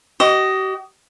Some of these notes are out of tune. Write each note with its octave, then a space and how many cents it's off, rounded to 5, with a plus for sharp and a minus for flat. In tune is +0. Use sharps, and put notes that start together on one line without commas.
G4 -45 D#5 +0